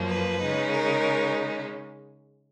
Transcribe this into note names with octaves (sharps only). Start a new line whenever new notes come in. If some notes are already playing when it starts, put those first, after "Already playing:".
Already playing: F#2 F3 A#3
B4
C#3 G#3 D#4
A#4